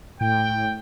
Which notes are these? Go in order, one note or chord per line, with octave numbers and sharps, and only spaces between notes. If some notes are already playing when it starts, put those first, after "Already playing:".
A2 G5